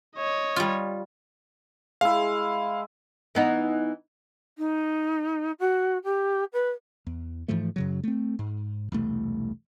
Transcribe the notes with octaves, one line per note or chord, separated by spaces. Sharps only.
C#5 D#5
G3 F4
G#3 E4 F5
E3 B3 D#4
D#4
F#4
G4
B4
E2
G#2 E3 F3 A3
F#2 C#3 F#3
A3 C4
G#2
E1 C2 A3